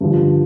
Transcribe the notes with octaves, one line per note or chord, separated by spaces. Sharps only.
G2 D3 F3